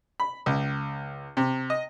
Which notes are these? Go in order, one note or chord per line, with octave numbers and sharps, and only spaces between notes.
B5
C#2
C3
D#5